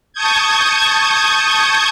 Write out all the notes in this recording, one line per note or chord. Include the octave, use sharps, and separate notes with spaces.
A5 C#6 D#6 G6 G#6